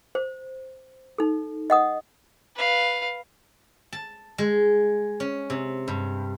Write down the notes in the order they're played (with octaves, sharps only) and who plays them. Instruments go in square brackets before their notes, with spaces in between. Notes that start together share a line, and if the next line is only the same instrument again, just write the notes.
[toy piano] C5
D#4 A4
D#5 F#5 D#6
[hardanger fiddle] B4 F5
[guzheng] A5
G#3
C#4
C3
G2